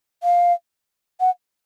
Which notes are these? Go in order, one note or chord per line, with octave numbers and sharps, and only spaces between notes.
F5
F#5